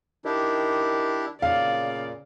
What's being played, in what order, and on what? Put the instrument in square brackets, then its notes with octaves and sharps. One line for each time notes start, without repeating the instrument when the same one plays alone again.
[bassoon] D#3 [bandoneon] D4 E4 G4
[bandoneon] A#2 [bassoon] C#3 [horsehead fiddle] D5 [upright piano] F5